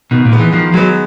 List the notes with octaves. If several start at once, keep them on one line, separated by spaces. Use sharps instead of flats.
B2 D#3
A#2
G#3 B3
E3
D#3 F3
F#3 G#3 B3